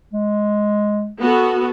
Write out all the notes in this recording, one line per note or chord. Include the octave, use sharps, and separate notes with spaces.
G#3
B3 F#4 A4